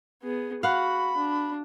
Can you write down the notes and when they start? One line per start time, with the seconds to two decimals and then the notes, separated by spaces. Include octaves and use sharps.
0.24 B3 G#4
0.63 F#4 F5 F#5 B5
1.17 D4